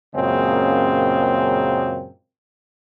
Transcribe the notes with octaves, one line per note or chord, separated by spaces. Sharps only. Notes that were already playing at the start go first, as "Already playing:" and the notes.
F#2 A#2 C#3 G#3 A#3 C4